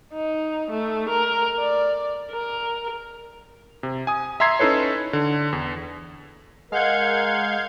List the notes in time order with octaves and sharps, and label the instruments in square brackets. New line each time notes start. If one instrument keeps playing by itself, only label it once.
[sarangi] D#4
A3
A#4
D5
A#4
[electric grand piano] C3
G#5 D#6
E5 A#5 C6 G#6 C7
C#4 D#4 E4 A4 B4 C#5
D3
E2
[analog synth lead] G#3 [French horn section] A#4 [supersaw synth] F5 G6 G#6 [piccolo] F#5